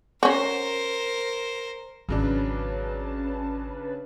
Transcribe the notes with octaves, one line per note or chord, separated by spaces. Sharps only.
C#4 F#4 A#4 C5
G#1 C#3 F#3 C#4 D4 B4 A5